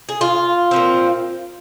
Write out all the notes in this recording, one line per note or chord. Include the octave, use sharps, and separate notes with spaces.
G#4
F4
A#2 F3 C4